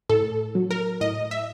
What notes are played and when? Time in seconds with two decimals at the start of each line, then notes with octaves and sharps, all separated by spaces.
0.09 A2 A4
0.55 F#3
0.71 A#4
1.01 A2 D#5
1.31 E5